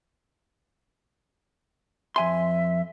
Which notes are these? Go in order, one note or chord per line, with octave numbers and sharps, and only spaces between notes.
F2 E5 G#5 C6